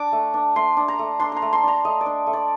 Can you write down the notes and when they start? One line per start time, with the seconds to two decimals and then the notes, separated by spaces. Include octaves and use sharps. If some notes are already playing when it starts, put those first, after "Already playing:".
Already playing: D4 D6
0.12 A3
0.34 D4
0.55 A3 C6
0.77 D4
0.88 A#5
0.99 A3
1.20 D4 C6
1.32 A#5 C6
1.42 A3
1.53 C6
1.63 D4 A#5
1.85 A3 D#5
2.01 D5
2.06 D4
2.27 A3
2.33 D5